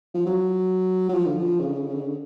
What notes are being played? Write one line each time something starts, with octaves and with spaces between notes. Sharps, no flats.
F3
F#3
F#3
F3
D3
F3
C#3
D3
C#3
D3
C#3
D3
C#3
D3